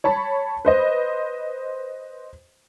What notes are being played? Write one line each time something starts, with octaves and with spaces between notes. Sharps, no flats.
C#5 A5 B5
B4 C5 D#5